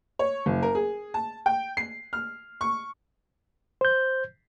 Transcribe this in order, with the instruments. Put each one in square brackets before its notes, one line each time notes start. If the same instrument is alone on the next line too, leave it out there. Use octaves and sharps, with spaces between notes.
[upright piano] C#5
F#1
A#4
G#4
A5
G5
C7
F6
C#6
[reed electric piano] C5 G6